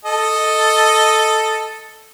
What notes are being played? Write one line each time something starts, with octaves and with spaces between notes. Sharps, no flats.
A4 D#5